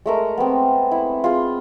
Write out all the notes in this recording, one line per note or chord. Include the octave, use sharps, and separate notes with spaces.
G#3 A3 A#4
B3 C4
E4
F4 G#4